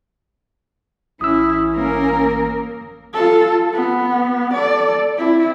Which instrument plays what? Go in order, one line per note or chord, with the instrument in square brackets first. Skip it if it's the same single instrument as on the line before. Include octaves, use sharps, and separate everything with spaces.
[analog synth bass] A1 [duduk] C#4 [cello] E4 [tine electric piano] D#6 E6
[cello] A#3 A#4
[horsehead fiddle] F4 A4
B3
A4 D5
C4 E4